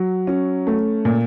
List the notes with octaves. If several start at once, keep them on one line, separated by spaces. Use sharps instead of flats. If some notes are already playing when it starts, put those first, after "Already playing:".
Already playing: F#3
C#4
A3
A#2